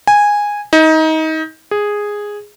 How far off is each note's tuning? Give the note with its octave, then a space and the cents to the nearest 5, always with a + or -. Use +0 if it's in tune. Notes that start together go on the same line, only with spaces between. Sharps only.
G#5 -10
D#4 +25
G#4 -5